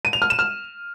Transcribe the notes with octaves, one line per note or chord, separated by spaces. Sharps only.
D#7
F7
F6
E7
F6